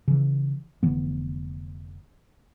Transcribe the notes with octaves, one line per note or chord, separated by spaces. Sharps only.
C#3 E3
F1 D3 E3 B3